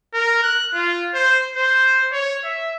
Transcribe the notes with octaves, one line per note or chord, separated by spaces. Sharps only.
A#4
F#6
F4
C5
C5
C#5
E5